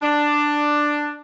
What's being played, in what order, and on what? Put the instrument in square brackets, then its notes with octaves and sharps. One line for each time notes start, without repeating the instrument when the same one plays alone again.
[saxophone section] D4